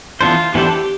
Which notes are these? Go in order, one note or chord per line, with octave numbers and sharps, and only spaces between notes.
E3 B3 D4 F4 A4 C5
E3 B3 D4 G4 A4 C5